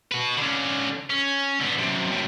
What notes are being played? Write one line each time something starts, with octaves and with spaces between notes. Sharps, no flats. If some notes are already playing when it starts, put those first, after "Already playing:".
F#4 B4
D3 C#4
C#4
D3 B3
F#2 C3
F#2 A2